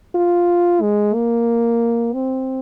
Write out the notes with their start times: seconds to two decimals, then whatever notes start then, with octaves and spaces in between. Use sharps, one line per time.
0.15 F4
0.82 G#3
1.14 A#3
2.13 C4